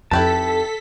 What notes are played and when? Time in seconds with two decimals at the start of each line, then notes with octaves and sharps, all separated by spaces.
0.11 F2 D#4 E4 G4 A4 B4 A5 B6